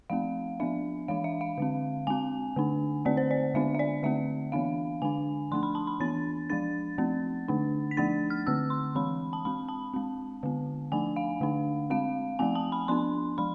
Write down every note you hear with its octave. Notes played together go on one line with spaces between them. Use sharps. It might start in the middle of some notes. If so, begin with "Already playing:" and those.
F3 A3 C4 F5
F3 B3 D4 E5
E3 G#3 D4 F5
E5
F5
D3 G#3 C4
G#3 C4 G#5
D3 A3 D4
D3 A3 C4 D5
C5
D5
D3 G#3 B3 D4 E5
E5
D5
D3 A3 C4 E5
E3 B3 D4 F5
D3 G#3 D4 G#5
F3 A3 D4 C6
B5
A5
B5
E3 B3 D4 A6
F3 G#3 D4 A6
F3 A3 C4
D3 A3 D4
B6
F3 A3 D4 A6
F6
D3 A3 C4 E6
C6
E3 G#3 C4 B5
A5
G#3 C4 B5
A5
G#3 C4
D3 G#3 B3
F3 A3 D4 G#5
F5
D3 A3 D4
G#3 C4 F5
F3 A3 C4 G#5
A5
B5
F3 B3 D4 C6
F3 G#3 B5